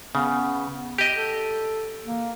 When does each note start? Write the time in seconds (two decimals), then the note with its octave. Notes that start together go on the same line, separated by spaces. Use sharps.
0.15 C#3 B3
0.98 G4 D#5
1.14 A4
2.05 A#3